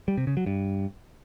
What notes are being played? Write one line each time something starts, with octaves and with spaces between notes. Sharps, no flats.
G3
C3
C#3
F#3
G2